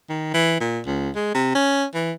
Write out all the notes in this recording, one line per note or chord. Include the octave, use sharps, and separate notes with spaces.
D#3
E3
A#2
C#2
G#3
C3
C#4
E3